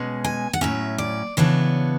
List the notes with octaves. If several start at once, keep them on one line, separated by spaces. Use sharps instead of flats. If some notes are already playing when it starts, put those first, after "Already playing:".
Already playing: B2 G#3 C#4
G#5
F#5
A2 F#3 C#4 E5
D5
C#3 E3 B3 D4 C#5